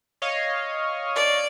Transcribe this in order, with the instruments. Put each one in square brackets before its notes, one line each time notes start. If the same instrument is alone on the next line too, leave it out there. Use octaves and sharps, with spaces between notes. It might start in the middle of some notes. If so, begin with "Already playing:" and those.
[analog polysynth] C#5 D#5 F5
[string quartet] D5